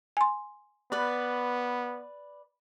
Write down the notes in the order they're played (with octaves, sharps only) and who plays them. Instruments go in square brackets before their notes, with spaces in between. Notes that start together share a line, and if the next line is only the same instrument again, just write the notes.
[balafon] G#5 C6
[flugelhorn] B3 [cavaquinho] B4 D5 [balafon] B5